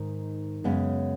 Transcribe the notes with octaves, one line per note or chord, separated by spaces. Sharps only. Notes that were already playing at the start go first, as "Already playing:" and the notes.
Already playing: G#2 D#3 D#4
F#2 C#3 G#3 B3